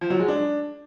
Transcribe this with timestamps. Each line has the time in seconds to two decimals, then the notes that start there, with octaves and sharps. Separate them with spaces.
0.01 F3
0.10 F#3
0.19 G#3
0.28 D4